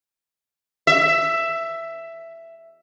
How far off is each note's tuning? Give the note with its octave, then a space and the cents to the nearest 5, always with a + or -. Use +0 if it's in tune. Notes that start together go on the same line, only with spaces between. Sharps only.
E5 +10